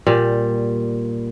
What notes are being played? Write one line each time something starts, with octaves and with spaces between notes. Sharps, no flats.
A#2 G3